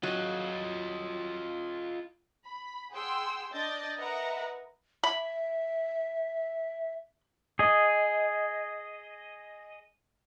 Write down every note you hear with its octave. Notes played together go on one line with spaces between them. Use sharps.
F#3 F4 D#5
B5
G#4 F#5 G5 C6 E6
D4 D5 D#5 G6 A6
A#4 B4 D#5 E5 F#5 A#5
E5 B5
G#4 D#5